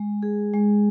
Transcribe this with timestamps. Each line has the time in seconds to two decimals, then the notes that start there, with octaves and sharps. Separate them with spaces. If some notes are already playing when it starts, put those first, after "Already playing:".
Already playing: G#3
0.23 G#4
0.54 G#3